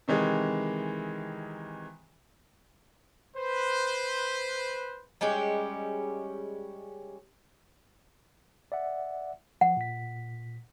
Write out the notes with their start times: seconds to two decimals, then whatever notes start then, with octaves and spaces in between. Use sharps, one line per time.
0.08 C3 D#3 E3 G#3
3.37 B4 C5
5.21 G3 G#3 C#4 G4
8.72 D5 E5 F#5
9.61 F3 F#5
9.77 A#2 B6